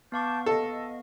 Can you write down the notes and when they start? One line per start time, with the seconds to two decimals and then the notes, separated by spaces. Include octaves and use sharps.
0.12 B3 F5 A5 C#6 D6 G6
0.46 A4 D#5